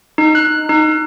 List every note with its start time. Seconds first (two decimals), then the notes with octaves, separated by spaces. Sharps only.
0.18 D#4
0.35 F#6
0.69 D#4